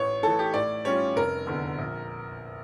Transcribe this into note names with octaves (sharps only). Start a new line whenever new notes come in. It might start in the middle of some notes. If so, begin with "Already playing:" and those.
Already playing: A1 C#5
A2 E3 A4
G4
A2 D5
G3 C#4 F4 C#5
F1 A#4
E2 D3
A#1